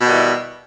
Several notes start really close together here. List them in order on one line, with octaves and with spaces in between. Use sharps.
B2 D#3 G3 E3